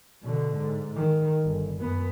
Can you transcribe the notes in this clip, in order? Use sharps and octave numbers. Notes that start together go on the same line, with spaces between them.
B2 D3
G#2
D#3
G1
F#2 B3